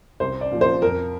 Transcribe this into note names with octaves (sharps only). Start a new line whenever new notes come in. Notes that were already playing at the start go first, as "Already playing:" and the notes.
C2 C5
D5
A#2 F3
C5
F2 A#4